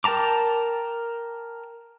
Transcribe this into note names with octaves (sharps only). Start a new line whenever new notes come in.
A#4 G5 A5 A#5 D6